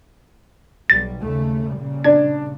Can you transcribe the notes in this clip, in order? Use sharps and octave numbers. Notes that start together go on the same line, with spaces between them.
B1 G3 A6
D#2 C#3 A3
A#2 C#3 G3
D4 G#6